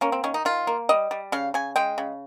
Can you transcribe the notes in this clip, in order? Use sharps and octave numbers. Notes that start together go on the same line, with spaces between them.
A#3 C#4
C4
D#3 C#4
D#4
D#3 F4
A#3
G3 D#5
G3
C#3 F5
C#3 G#5
G#3 G5
C#3